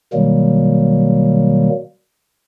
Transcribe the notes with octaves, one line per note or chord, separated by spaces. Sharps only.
B2 D#3 F#3 G3 A#3